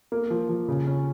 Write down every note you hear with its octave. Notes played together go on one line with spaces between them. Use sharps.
A#3
F3
F3
C#3
C#4